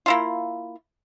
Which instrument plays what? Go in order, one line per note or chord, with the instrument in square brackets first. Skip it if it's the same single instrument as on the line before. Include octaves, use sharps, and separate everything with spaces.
[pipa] A#3 E4 F4